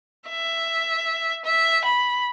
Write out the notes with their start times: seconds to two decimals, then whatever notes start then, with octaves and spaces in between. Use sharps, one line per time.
0.29 E5
1.45 E5
1.85 B5